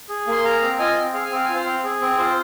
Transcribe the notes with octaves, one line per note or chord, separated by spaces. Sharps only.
G#4
A#3 C6
G#4 F5 A#5
C4
F4 D#5 G#5
C4
G#4 F5
G#5
C4 F5
F4 G#5
C5 F5
C4
G#4
C4
F4 C5